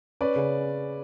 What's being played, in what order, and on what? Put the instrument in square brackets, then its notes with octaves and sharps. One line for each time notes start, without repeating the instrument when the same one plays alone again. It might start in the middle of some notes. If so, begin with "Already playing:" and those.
[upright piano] C#4 [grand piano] B4 D5
[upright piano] C#3